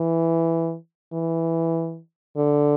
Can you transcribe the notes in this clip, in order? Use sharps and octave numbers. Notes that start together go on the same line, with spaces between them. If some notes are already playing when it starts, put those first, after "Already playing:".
Already playing: E3
E3
D3